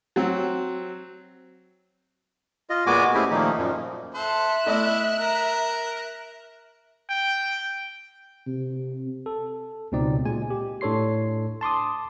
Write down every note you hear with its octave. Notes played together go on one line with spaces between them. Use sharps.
F#3 C4
F4 D#5
A#2 G#3 B3 F#4 G#5 D6
A3 C4 C#4 E4 G4 G#4
A#2 D#3 F3 A3 A#3 D#4
F#2 A#2 F3
A4 C5 E5 F#6
A3 E4 D5 D#5
A#4
G5
C3
A4
C#2 B2 C4 D#4 D5
A#2 G#3 G#5
G4
A2 D4 A4 C#5 C6 C7
A5 C6 D6 D#6